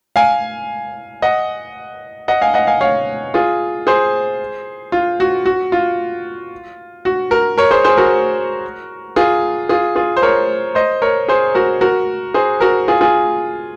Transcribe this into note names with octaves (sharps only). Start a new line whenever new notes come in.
F5 G#5
D#5 F#5
D#5 F#5
F5 G#5
D#5 F#5
F5 G#5
C#5 F5
F4 G#4
G#4 C5
F4
F#4
F#4
F4
F#4
F#4 A#4
A#4 C#5
G#4 C5
G#4 C5
F#4 A#4
F4 G#4
F4 G#4
F4 G#4
C5
A#4 C#5
C5 D#5
A#4 C#5
G#4 C5
F#4 A#4
F#4 A#4
G#4 C5
F#4 A#4
F4 G#4
F4 G#4